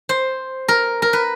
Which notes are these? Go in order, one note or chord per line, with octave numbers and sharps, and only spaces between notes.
C5
A#4
A#4
B4